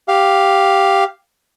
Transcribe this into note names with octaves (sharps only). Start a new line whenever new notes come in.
G4 F5